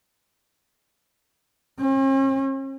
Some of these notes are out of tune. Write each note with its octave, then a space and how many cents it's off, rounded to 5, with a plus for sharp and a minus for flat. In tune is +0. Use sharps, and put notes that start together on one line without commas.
C#4 -45